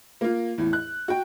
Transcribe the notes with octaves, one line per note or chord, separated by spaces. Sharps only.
A#3 F4
E2 A2
F#6
F#4 G5